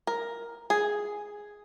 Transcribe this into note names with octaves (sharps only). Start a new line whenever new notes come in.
A#4
G#4